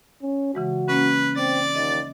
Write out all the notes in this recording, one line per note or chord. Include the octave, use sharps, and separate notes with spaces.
C#4
C#3 E3 G#3 F#4
A#3 C#4 B4
C4 D5 A6
D#2 D#5